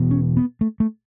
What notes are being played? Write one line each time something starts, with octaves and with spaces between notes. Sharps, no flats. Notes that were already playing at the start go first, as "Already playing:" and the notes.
Already playing: E1 E2 B2
C#4
B3
A3
A3